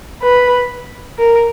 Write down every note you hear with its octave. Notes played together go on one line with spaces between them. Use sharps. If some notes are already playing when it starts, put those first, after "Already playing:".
B4
A#4